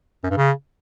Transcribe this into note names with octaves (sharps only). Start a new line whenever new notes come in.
F#2
G2
C#3